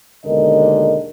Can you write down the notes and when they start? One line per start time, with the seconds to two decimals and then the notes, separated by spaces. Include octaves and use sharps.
0.25 D#2 B2 D3 G#3 A#4 D#5